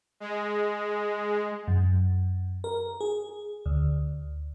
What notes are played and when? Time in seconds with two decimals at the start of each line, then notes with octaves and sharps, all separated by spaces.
0.20 G#3
1.68 F#2
2.64 A#4
3.00 G#4
3.66 D2